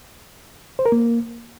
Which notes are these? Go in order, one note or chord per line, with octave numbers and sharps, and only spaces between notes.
C5
A#4
A#3